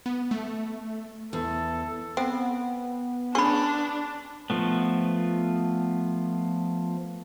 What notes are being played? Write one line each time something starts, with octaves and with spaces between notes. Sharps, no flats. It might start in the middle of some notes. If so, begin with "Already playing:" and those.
B3
A3
E2 A4
B3 C4
C#4 D4 G#4 B5 C#6
F3 A3 B3